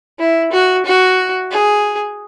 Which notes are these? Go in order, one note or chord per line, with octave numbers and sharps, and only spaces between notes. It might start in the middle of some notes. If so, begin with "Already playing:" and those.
E4
F#4
F#4
G#4